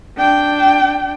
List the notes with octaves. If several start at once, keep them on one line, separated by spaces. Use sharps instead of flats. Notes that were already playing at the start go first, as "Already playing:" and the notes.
D4 G5